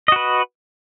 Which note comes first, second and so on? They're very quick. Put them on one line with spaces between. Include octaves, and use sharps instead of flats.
D#5 F#4 B4